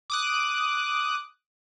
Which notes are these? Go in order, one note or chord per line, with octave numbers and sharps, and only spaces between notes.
D6 D#6 F#6